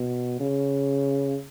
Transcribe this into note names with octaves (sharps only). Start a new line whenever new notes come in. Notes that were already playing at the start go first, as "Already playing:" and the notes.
Already playing: B2
C#3